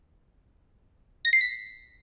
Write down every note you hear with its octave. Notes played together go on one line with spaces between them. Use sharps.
A#6
C7
B6